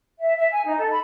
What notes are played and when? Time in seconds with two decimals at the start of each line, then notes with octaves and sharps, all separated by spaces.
0.19 E5
0.36 E5
0.51 G#5
0.65 D#4
0.78 A4
0.91 B5